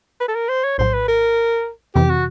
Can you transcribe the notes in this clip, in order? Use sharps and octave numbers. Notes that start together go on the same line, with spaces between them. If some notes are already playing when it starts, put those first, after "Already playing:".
B4
A4
A#4
C5
C#5
A#1 A2 F#3 C5
B4
A#4
F2 C3 E3 G4
F#4